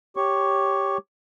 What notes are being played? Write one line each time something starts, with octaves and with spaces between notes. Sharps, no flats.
G4 C#5 C#6